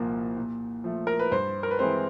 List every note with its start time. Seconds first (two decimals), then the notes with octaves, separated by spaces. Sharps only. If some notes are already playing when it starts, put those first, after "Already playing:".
Already playing: C2 A#2 F3 A#3
0.37 A#2
0.84 F3 A3
1.07 A#4
1.19 B4
1.32 G2 C5
1.63 A#4
1.71 B4
1.79 E3 G#3 C4 C5